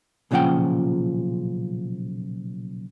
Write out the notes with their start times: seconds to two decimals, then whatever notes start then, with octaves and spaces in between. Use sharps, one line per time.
0.31 B1 A#2 C#3 F3 F#5 G5